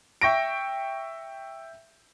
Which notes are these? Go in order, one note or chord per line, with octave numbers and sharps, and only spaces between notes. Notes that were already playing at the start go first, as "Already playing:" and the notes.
E5 G5 C#6 A#6 D7